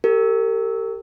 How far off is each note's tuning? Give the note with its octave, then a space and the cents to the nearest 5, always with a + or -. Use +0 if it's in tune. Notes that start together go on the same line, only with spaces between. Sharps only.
G4 +0 A#4 -40